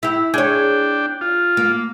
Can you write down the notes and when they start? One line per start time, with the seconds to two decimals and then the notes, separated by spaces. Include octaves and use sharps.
0.03 E4 G4
0.34 D4 G#4 C#5 G5
1.21 F4
1.57 A#3